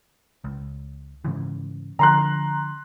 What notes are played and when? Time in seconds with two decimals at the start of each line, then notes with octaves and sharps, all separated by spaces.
0.44 C#2
1.24 G#2 C#3 E3
1.99 D3 F3 A#5 C6 F#6